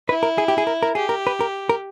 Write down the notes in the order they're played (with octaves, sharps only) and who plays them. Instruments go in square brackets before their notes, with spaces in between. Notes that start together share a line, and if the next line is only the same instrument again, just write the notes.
[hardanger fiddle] E4 [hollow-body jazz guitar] B4
[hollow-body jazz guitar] A#4
G#4
G4
G#4
A#4
A#4
[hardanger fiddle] G4 [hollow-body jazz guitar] G#4
[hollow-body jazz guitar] A#4
B4
A#4
A#4